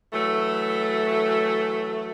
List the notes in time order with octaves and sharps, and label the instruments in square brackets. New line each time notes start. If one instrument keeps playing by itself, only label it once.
[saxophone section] E3 F#3 A3